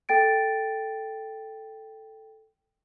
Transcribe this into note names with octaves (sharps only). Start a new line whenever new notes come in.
A4 G5 A6 D7